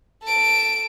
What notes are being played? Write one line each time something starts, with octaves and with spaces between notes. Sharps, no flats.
A4 D7